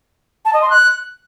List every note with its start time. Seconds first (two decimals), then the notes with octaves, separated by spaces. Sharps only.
0.45 A5
0.53 D#5
0.62 C6
0.70 F#6